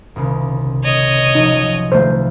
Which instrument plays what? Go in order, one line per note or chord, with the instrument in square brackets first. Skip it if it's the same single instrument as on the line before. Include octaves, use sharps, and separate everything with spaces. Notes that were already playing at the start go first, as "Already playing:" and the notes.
[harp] D#1 C2 C#3
[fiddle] C#5 D#5
[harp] C3 F3 F#3 [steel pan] D#4
[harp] D#1 F4 [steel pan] A3 C5